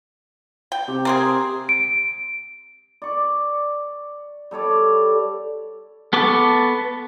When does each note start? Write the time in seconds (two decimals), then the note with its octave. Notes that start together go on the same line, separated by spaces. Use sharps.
0.72 G5
0.88 C3
1.05 A#3 C4 G#4
1.69 D7
3.02 D5 C#6
4.51 G3 A4 C#5 D5
6.13 B3 A4 C#6 D6